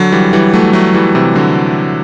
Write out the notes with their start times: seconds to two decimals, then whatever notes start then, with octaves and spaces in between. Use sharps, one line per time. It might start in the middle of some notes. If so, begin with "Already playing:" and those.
Already playing: D3 F#3
0.12 E3 G3
0.33 E3 G3
0.54 F#3 A3
0.73 F#3 A3
0.94 E3 G3
1.15 C3 E3
1.35 D3 F#3